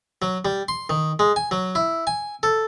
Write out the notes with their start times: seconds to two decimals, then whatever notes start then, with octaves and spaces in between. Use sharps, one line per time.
0.22 F#3
0.45 G3
0.68 C6
0.90 D#3
1.19 G#3
1.36 G#5
1.51 F#3
1.75 E4
2.07 G#5
2.43 A4